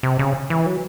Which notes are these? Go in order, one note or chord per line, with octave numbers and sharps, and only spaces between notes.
C3
C#3
E3
F#3